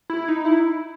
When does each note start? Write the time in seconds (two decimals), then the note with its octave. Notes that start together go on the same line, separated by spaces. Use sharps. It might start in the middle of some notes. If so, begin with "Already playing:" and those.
0.10 E4
0.28 D#4
0.45 E4